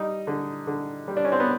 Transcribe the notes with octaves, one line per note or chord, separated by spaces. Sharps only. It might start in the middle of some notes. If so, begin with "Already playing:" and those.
Already playing: G3 D#4
D3
D3
G3
D4
C#4
C4
B3